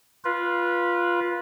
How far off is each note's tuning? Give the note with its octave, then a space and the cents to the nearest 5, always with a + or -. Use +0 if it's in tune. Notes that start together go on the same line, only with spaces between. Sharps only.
F4 +0 B4 -20